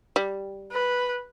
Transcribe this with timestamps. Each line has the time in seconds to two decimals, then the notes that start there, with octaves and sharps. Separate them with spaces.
0.16 G3
0.72 B4